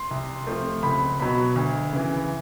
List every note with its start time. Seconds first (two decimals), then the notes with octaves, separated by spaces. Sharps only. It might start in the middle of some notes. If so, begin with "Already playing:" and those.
Already playing: C6
0.11 C2
0.47 C3 F3 A3
0.83 C#2 B5
1.20 B2 F#3 B5
1.56 D2
1.93 C#3 E3